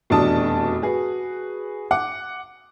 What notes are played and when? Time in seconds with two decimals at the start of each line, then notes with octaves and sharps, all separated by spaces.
0.10 F1 E2 B2 D4 A5 D#6
0.82 F#4 G#4 B4
1.91 F#5 D6